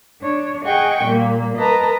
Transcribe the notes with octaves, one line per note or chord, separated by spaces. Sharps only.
D4 C#5
G#4 D#5 F#5 G5 C#6
A#2 G3 A#3
A#4 B4 D#5 A5 A#5